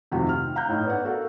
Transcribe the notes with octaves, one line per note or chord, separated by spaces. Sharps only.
F1 C3 D#3 F3 F#4 G5
F6
F5 A#5 F#6 G6
A2 D#4
B3 D5 F#5
F#4 A4 A#4 F5 F#5